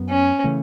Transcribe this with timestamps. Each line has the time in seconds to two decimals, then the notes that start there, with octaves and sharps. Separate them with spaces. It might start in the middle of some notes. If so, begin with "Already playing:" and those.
Already playing: F#2 F#3 B3
0.10 C#4
0.44 C#3 E3 A3